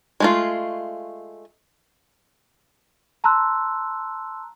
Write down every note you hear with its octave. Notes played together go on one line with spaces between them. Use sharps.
G#3 A3 F4
A5 A#5 C6 E6 F#6